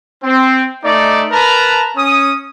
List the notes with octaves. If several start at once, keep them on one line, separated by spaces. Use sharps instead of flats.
C4
A3 D#4 D5
A#4 B4 A5 A#5
C#4 D#6